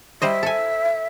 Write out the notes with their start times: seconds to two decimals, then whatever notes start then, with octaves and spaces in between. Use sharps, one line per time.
0.22 G3 C5 D#5 E5
0.43 A4 G#5